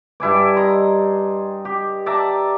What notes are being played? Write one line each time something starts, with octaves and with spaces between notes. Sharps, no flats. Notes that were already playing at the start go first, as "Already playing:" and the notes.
G2 E4 G#5 D6
D#5 A#5 C6
G4
D5 E5 A5 A#5